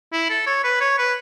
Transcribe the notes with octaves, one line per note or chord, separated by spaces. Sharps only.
E4
A4
C#5
B4
C#5
B4